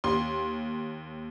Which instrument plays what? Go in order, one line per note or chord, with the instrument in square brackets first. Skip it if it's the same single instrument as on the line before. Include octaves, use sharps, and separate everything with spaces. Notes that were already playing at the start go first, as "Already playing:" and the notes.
[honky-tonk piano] D#2 C6